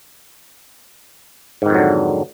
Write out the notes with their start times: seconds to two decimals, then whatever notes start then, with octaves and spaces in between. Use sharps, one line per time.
1.62 G#2
1.66 D#3
1.70 F2
1.74 F#3
1.78 D3